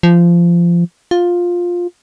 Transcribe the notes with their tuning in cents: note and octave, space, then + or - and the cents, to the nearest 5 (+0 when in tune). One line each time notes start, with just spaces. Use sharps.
F3 -20
F4 +10